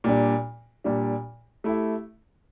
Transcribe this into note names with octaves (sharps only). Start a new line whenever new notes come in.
A#2 G3 D4
A#2 G3 D4
A3 E4 G4